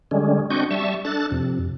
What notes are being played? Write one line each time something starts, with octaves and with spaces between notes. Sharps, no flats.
D3 G3 G#3 C#4
C4 D4 F#4 D#5 C#6 G6
G3 E5 A5 C#6
D4 A4 F#6 A6
F2 C3